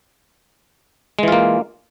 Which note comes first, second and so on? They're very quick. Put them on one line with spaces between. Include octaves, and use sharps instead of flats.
G#3 E3 F4 A#3